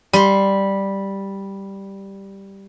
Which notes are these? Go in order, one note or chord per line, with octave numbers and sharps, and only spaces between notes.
G3 C6